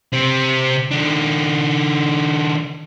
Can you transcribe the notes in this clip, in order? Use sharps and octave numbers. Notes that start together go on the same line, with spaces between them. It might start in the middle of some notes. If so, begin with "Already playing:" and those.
C3 C4
D#3 D4